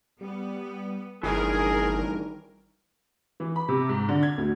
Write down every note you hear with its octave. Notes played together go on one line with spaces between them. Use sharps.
G3 B3
G1 G2 D#3 E3 G#4 A#4
E3
B5
C3
G#2
D3
G#6
D2